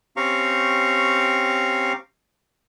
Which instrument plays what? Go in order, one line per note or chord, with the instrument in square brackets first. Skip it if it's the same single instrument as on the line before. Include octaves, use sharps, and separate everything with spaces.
[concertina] C4 C#4 G4 F5 A#5 C#6